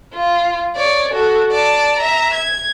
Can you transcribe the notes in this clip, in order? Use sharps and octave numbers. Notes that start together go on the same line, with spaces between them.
F4
C#5 D5
F#4 A4
D5 A5
E5 A#5
G#6